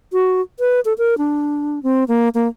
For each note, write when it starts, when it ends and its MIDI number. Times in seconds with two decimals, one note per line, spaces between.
0.13 0.41 66
0.59 0.80 71
0.85 0.93 69
0.98 1.17 70
1.18 1.82 62
1.83 2.04 60
2.08 2.29 58
2.34 2.48 58